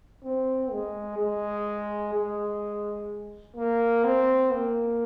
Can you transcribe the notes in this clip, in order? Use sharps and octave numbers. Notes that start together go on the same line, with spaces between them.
C4
G#3
G#3
G#3
A#3
C4
A#3